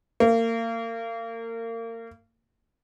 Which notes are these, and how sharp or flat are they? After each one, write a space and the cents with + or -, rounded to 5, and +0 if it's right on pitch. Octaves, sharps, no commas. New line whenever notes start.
A#3 -30